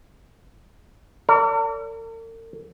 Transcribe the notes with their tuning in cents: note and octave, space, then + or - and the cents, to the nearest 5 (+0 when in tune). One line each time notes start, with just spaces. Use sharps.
A#4 -45 D5 -40